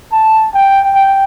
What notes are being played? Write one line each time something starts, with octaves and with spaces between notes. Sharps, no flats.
A5
G5
G5